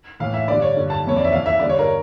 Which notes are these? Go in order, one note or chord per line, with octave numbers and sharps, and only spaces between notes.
A2 E3 F5
E5
G2 D3 D5
C#5
G2 D3
A5
F2 E3 C#5
D5
E5
E2 E3 F5
E5
G2 D3 D5
C#5
A#4